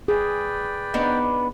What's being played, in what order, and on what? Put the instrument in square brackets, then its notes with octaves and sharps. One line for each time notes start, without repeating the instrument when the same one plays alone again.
[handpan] G#4 [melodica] B4 D5 G5
[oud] B3 D4 D#4